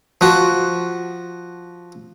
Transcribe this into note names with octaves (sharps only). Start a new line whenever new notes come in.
F3 F#4